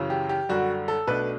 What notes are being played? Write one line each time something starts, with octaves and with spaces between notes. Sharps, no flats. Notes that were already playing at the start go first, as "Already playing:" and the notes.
Already playing: F#2 C#3 E3
G4
G4
F#2 D3 G3 F#4
A4
B1 B2 A3 D4 B4